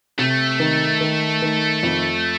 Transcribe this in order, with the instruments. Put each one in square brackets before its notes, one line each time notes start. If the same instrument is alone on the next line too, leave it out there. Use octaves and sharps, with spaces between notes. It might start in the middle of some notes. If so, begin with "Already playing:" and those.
[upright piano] C3 [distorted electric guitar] A3
[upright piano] D#3
D#3
D#3
F2